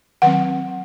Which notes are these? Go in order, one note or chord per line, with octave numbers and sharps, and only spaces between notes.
D#3 F#3 C4 F#5